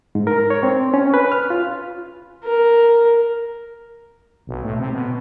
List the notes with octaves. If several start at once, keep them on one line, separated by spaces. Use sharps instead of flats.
G#2
A#4
C#5
C4
C#4
B4
F6
F4
A#4
B1
A2
C3
B2